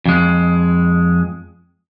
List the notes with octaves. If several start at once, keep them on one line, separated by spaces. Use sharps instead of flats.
F2 G#3